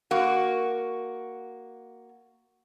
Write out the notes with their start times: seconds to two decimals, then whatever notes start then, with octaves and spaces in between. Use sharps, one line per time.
0.11 A#3 F#4